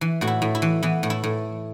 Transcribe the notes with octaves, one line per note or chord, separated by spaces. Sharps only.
E3
A2 F#4
E4
A2
E4
E3
E3 B3
A2
E4
A2